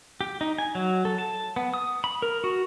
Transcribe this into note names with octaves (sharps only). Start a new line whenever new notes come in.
G4
D#4
G#5
F#3
A4
A5
B3
D#6
B5
A#4
F#4